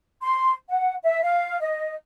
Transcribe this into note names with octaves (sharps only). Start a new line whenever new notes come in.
C6
F#5
E5
F5
D#5